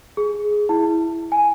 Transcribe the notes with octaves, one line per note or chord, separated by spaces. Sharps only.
G#4
E4
G#5